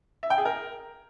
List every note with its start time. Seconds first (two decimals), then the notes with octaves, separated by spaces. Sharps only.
0.23 E5
0.30 G5
0.38 G#4
0.45 A#4